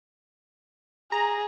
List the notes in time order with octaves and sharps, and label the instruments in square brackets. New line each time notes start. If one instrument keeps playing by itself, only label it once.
[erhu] G#4 [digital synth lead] A#5